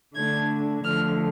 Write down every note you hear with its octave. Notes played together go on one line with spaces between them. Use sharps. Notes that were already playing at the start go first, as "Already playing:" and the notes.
D3 A3 D4 G#6
D3 F3 A3 F6